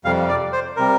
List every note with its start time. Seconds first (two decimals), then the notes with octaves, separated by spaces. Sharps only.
0.05 F2 C3 G3 F5
0.29 D5
0.53 C5
0.76 C3 G3 A#4